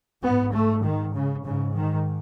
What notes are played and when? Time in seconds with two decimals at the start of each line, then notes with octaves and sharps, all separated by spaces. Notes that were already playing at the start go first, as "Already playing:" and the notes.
0.23 G#2 B3
0.53 A3
0.84 D#3
1.14 C#3
1.45 G#2 C#3
1.75 D#3